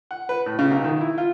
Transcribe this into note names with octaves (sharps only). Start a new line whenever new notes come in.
F#5
B4
A2
C#3
B1
D#3
E4
F4